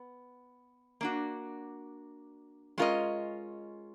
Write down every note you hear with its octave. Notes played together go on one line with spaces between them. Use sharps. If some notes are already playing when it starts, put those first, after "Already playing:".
Already playing: B3
A#3 D4 F#4
G#3 C#4 F4 A#4 D#5